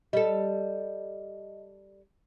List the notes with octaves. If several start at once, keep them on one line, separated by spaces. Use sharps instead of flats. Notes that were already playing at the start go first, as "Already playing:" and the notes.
G3 A4 D#5